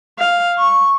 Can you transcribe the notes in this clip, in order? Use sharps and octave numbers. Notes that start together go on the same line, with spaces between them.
F5
C#6